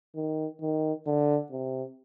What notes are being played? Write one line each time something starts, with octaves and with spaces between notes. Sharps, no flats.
D#3
D#3
D3
C3